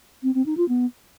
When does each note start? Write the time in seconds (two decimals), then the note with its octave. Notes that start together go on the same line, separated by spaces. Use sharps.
0.23 C4
0.34 C4
0.46 D#4
0.57 F4
0.69 B3